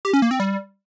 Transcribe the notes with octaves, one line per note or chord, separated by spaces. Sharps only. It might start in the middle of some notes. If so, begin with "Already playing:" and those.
G4
C#4
A#3
C4
G3